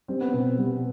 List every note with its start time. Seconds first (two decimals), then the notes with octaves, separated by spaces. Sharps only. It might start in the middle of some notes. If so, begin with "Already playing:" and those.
0.08 G3 C4
0.21 B3
0.33 B2 C4
0.58 G3 B3